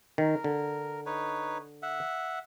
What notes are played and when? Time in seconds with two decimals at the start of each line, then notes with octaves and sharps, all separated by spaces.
0.18 D#3 A#4
0.44 D3
1.06 D#4 B4 C#5
1.83 E5 F#5